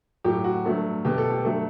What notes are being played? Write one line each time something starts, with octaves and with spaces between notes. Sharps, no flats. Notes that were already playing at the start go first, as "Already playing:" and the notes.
A2 F#3 A3 G4
F#4
G2 F#3 A3
B2 A3 G4
A4
G4
G2 F#3 A3 A4